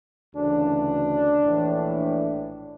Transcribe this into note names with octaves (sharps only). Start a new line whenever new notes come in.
D2 C#3 E3 D4
A#1 A2 E3
D4